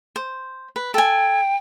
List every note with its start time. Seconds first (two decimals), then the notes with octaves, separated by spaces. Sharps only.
0.16 C5
0.76 B4
0.94 A4 G5 G#5